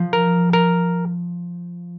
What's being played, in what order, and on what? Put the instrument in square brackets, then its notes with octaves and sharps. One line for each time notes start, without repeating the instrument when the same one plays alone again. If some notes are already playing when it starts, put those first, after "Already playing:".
Already playing: [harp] F3
[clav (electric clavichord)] A#4
A#4